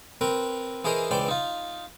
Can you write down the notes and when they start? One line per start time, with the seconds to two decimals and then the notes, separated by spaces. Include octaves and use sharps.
0.21 C4 A#4 B4
0.84 E3 G#4 A#4 C5 D#5
1.11 C#2 E3 C5 D5 G5
1.28 D#4 F4